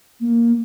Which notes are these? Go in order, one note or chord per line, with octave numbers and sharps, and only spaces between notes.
A#3